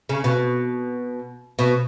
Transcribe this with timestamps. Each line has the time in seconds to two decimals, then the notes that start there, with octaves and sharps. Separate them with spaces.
0.09 C#3
0.24 B2
1.59 B2